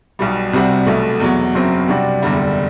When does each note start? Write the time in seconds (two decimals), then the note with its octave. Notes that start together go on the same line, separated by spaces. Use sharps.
0.19 B1 B2 G3
0.53 C2 C3 G3 C4 F#4
0.86 B1 B2 A3
1.20 E2 B2 F#3
1.55 F#1 F#2 F#3 C4
1.88 C3 G3 D4 F#4
2.22 F#1 E2 D3 G3